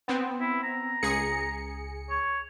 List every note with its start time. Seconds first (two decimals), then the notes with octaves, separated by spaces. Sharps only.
0.08 B3 C4
0.41 E4
0.64 A#5
1.03 C#2 G#4 C#7
2.10 C#5